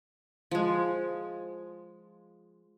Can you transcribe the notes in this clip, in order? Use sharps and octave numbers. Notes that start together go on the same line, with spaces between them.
F3 G#3